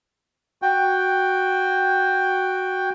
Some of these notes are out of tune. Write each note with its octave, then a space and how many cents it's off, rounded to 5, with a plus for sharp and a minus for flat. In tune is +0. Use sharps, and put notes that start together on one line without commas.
F#4 +0 G5 +5